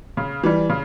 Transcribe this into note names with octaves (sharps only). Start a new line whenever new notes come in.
C#3
E3 G3
C#3